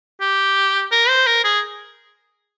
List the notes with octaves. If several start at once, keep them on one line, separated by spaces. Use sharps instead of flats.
G4
A#4
C5
A#4
G#4